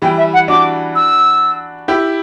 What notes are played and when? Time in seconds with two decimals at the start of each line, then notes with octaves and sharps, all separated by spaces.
0.02 E3 G3 G5
0.18 E5
0.34 F#5
0.48 D4 F#4 D6
0.95 E6
1.88 E4 G4